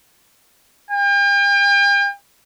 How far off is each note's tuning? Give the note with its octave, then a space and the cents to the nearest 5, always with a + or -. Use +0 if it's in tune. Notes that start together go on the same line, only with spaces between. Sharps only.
G5 +40